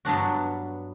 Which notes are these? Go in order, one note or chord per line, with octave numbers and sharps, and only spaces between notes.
G2 F#3 B3 D4 F#4